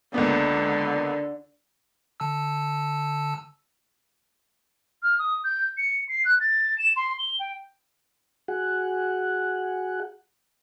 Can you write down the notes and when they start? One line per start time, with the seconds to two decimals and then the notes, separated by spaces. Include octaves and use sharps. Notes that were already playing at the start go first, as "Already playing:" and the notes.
0.14 C#2 D3 A#3 B3
2.20 D3 A5 E6
5.03 F6
5.19 D#6
5.44 G6
5.77 C#7
6.09 C7
6.25 F#6
6.40 A6
6.78 E7
6.96 C6
7.19 G7
7.40 G5
8.48 F#4 G#4 F#5